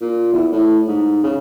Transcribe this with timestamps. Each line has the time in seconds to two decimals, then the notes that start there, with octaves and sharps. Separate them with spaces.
0.01 A#2
0.32 E2
0.52 A2
0.88 G#2
1.23 C#3